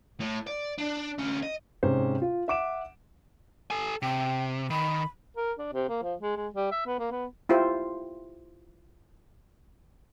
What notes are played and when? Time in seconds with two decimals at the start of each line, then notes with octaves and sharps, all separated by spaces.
0.21 A2
0.47 D5
0.78 D4
1.18 D2 C#4
1.43 D#5
1.83 G#2 C3 C#4 C5
2.22 F4
2.48 E5 F#5 D6 D7 E7
3.71 A4 G#5
4.02 C3 G5
4.70 D#3 B5
5.37 A#4
5.59 D4
5.73 C3
5.89 A#3
6.03 F3
6.21 G#3
6.37 G#3
6.54 G3
6.72 E5
6.86 B3
6.99 A#3
7.11 B3
7.49 E4 F4 G4 C5